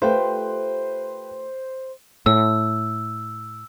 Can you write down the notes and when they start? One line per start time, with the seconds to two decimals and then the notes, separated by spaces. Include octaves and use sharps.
0.02 A3 F4 G4 B4 C5 G5
2.26 A2 E6